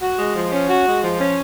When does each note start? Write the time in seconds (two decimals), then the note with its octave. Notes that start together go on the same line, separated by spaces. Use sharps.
0.01 F#4
0.18 G#3
0.36 F3
0.51 C#4
0.69 F#4
0.86 G#3
1.02 F3
1.20 C#4